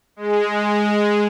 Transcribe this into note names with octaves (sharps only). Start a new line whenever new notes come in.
G#3